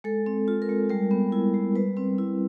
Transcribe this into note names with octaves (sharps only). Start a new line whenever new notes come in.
G#3 A4
C4
F4
A#4
G#3
G3 A#4
B3
E4
G3
G3 B4
C4
E4